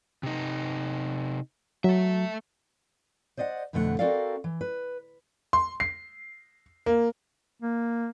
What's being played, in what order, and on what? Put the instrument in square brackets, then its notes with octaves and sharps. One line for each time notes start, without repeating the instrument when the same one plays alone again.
[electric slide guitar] C3 D#4
[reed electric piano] F#3 [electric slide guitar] A3 E5
[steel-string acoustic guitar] C5 D5 D#5 F5 F#5
F2 B2 D3 A3 G#4 F#5
C4 F#4 A4 A#4 D5 F5
E3
B4
[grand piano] C6
C7
A#3
[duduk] A#3